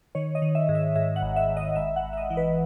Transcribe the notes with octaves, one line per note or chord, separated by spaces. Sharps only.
D#3 C#5
D#5
D#3
E5
G#2
E5
G#2 E5
F#5
G#1
E5
G#1
D#5
G#1 E5
F#5
G#1
E5
D#5
E3
B4